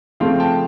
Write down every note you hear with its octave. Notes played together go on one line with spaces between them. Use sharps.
C#3 F3 A3 C4 F5 G5
G5 A5